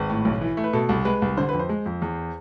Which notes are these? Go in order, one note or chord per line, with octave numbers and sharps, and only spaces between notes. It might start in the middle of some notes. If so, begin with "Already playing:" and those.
Already playing: G#1 B4
A2
B1
E3
A3
B4
B2 A4
C2
G#3 B4
C2
D3 C5
F2 B4
C5
G#3
F2
E2